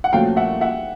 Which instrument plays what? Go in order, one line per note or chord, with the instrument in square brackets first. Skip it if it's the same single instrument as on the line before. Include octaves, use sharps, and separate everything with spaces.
[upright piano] F#5
[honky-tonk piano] A#2 F3 A3 C#4 F#4 [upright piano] F5 G5
[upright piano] E5 F#5
E5 F#5